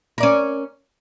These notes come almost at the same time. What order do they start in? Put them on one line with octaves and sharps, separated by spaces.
A#4 D5 C#4